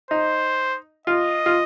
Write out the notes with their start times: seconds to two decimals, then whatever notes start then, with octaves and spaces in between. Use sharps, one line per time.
0.11 D#4 C5
1.07 F4 D#5
1.46 F4